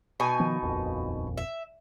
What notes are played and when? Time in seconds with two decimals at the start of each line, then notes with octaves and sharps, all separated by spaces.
0.20 B2 D#4 G#5
0.40 D#3 F3 B3
0.62 D#1 A#1 F2
1.37 E5